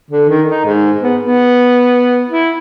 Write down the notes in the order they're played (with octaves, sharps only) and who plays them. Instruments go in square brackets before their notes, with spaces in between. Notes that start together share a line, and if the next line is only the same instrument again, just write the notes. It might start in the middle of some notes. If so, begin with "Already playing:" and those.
[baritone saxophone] D3
D#3
D#4
G#2
B3
B3
E4